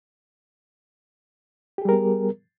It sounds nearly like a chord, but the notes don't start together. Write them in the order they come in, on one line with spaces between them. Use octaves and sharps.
G4 G#4 G3 A#4 B3